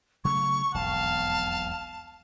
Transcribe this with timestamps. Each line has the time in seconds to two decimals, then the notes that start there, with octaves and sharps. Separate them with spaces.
0.25 C#3 F#3 A3 C#6
0.74 E1 B1 F2 F5 A5